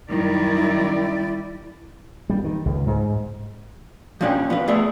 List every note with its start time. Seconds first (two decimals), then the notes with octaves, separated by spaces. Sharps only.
0.11 F#2 D#3 G3 E4 D5
2.30 G3
2.44 D#3
2.66 C#2
2.87 G#2
4.21 F3 A#3 C#4 D4 G4
4.50 B3 F4 B4
4.68 A3 B3 G#4 D5 E5